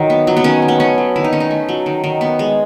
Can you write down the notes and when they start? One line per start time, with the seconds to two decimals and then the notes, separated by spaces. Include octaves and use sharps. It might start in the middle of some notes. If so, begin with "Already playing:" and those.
Already playing: D#3 F#3
0.10 B3
0.27 F#3
0.37 B3
0.44 D#3 C#4
0.62 D#3
0.68 B3
0.80 A3 C#4
0.98 F#3
1.16 D#3 E4
1.24 D#4
1.32 D#3 C#4
1.40 D#4
1.51 A3
1.69 F#3
1.86 D#3
2.04 D#3
2.21 B3
2.39 G#3